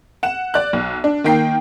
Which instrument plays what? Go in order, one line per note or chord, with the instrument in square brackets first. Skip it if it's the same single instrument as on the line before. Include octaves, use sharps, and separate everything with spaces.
[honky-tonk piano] F#5 E7
D5 F#6
B1
D4
D#3 A#3 G5 C7